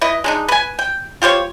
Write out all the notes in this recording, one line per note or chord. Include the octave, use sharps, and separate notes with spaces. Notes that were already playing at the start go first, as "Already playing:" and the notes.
E4 B4 D#5
G#3 D4 D#4
B4 G#5
G5
F4 G4 C5 C#5